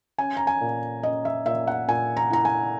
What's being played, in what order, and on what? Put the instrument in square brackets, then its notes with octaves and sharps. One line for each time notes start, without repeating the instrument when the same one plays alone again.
[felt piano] C#4 G#5
A#5
G#5
A#2
C#4 D#5
E5
A#2 E5
F#5
A#2 G#5
A#5
E4 A#5
G#5